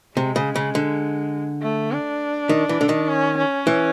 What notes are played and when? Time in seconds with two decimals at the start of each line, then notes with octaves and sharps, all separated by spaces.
0.17 C3 G#3
0.36 C#3
0.55 C#3
0.75 D3
1.63 A3
1.92 D4
2.49 D#3
2.69 E3
2.81 D3
2.89 D#3
3.08 C#4
3.37 C#4
3.67 E3